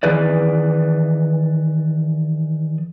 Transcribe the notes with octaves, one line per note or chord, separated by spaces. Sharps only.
D#3 E3 G#4 B4 D5